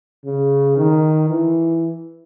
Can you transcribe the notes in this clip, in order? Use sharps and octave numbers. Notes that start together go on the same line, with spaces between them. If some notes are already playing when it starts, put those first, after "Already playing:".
C#3
D#3
E3